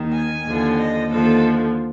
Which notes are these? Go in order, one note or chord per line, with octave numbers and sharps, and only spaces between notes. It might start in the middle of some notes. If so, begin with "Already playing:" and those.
Already playing: D#2 D#3
G#5
D#2 D3 F3
D#5
D#2 D3 F3 A4